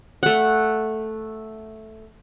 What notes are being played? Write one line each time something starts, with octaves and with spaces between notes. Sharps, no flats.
A3 F#5